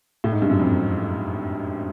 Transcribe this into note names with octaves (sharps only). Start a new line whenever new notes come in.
A2
G#2
G2
F#2
F2